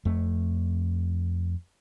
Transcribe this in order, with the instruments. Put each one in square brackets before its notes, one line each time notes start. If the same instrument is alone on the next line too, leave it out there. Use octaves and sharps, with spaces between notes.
[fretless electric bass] F2 A3